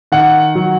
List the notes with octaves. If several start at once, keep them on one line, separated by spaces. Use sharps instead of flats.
D#3 F#5
F#3